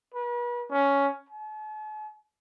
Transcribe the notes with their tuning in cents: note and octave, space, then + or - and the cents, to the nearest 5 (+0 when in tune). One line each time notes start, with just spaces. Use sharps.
B4 -40
C#4 +10
A5 -45